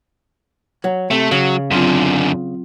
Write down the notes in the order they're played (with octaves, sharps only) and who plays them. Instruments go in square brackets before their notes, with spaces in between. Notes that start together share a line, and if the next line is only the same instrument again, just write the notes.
[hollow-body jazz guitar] F#3
[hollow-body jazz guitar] C3 [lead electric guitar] A3
[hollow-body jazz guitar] C#3 [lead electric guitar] F#3 [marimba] G#4
[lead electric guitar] F#2 D3 [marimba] F#3 C4 F4